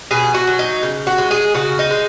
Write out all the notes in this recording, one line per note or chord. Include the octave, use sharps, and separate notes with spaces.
B2 G#4
F#4
F#3
D#4
C#3
F#4
G#3
G#4
C#3 F#4
D#4
G#3